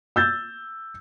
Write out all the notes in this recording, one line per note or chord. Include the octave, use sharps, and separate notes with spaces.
E6 G6 A6